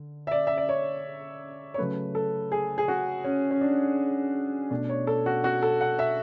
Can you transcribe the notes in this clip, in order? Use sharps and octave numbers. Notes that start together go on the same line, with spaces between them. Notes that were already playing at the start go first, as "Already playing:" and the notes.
Already playing: D3
E5
D5
E5
D5
C#5
C#5
C#3 F#3 A3 B4
A4
G#4
G#4
F#4
C#4
C#4
D4
B2 A3 D4
C#5
A4
F#4
F#4
A4
F#5
E5